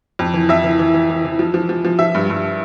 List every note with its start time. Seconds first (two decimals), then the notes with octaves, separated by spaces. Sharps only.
0.19 F2
0.34 E3
0.49 F2 E5
0.64 E3
0.79 E3
0.94 E3
1.10 E3
1.25 E3
1.39 F3
1.54 F3
1.69 F3
1.85 F3
1.99 F3 E5
2.15 G2
2.30 G2